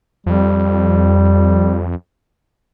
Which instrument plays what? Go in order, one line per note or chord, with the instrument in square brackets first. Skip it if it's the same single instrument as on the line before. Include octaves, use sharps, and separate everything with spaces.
[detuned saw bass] F2 [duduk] G3